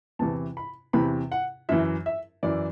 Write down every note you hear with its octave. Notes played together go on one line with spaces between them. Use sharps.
E2 C3 E3 A5
B5
E2 C3 E3 B5
F#5
F#2 E3 E5
E5
F#2 E3 D5